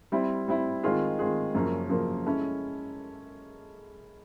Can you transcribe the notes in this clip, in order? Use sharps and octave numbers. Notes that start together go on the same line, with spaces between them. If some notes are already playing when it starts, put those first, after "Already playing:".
G3 C4 E4
G3 C4 E4
D#3 G#3 C4 F4 G#4
D#3 G#3 C4 F4 G#4
F#2 C#3 F3 A#3 C#4
F#2 C#3 F3 A#3 C#4
G#3 C#4 E4 A4